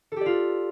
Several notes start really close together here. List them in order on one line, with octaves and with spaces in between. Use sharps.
A4 G4 D5 F4